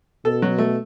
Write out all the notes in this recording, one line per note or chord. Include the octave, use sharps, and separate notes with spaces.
B2 A4
F#3
A3